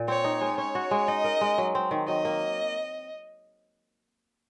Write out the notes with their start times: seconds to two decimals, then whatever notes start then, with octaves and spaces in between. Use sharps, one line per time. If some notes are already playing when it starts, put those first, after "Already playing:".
Already playing: A#2
0.08 C4 C#5
0.24 D#4
0.41 G#3
0.57 C#4 C#5
0.75 F#4
0.91 G#3
1.08 D#4 D#5
1.24 A#4
1.41 G#3
1.58 F#3
1.75 C4
1.91 D#3
2.08 F#3 D#5
2.25 A#3